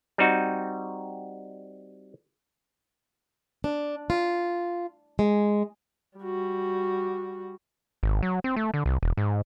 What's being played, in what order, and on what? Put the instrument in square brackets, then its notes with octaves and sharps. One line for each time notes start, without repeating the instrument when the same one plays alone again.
[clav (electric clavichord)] G3 C4 D#4 F#4
[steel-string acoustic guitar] D4
F4
G#3
[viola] G3 F#4
[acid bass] G#1
F#3
C4
A3
D3
C2
E1
G#2